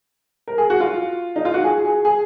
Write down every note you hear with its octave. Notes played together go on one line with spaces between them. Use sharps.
A#4
G#4
F#4
F4
D#4
F4
F#4
G#4
G#4
G#4